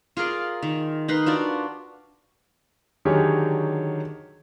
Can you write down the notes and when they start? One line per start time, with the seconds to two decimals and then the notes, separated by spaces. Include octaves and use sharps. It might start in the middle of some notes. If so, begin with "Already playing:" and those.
0.17 F4 G#4 A#4 D5
0.62 D#3
1.08 D#4 A#4 B4 C6
1.26 D4 F4 F#4 D5
3.05 D3 D#3 F#3 G4 G#4 C#5